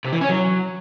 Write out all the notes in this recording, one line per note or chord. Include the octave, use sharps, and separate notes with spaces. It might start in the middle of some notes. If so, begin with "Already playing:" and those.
C3
E3
C#4
F#3